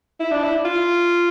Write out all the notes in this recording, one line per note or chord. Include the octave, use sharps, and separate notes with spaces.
E4
D4
E4
F4